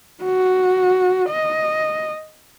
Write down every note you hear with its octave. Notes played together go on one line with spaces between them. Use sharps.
F#4
D#5